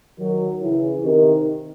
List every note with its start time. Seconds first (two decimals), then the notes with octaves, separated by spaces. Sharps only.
0.19 D#3 F#3
0.61 C#3 E3
1.03 C3 D#3